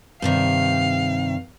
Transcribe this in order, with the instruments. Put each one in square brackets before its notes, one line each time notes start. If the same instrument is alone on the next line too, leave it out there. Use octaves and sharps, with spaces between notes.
[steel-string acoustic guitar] G2 C3 D#3 [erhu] F5